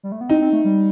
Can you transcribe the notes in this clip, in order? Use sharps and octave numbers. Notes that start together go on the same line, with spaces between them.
G3
A3
B3
C4 D#4
C4
A3
G3